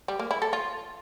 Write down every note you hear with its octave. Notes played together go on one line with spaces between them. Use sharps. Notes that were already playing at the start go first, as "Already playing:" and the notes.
G3
A#3
E4
A4
F4